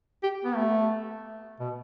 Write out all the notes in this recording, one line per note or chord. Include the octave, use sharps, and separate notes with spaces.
G4
B3
A3
B2